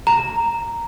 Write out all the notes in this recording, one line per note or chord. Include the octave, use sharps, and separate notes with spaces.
A#5